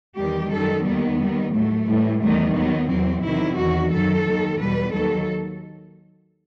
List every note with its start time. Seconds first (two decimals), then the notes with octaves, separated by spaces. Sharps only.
0.17 E2 D#3 G3 G4
0.51 F#2 D#3 G3 A4
0.84 D#2 D#3 G3 B3
1.19 D#2 D#3 G3
1.53 A2 F#3 A3
1.87 A2 E3 G3
2.21 E2 D#3 G3 A3
2.54 D#2 D#3 F#3 B3
2.89 E2 C3 F#3 C4
3.23 E2 C3 D#3 F#3 E4
3.57 E2 D#3 F#3 F#4
3.91 F#2 D#3 F#3 A4
4.25 D#2 D#3 F#3
4.59 E2 B2 G3 B4
4.93 D#2 D#3 F#3 A4